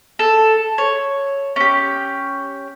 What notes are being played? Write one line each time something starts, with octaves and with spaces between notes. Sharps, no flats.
A4
C#5
C#4 G4